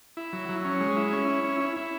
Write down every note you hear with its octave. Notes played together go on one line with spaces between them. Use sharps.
E4
F#3
F#3
C#4
G#3
E4
C#4
E4
C#4
E4
E4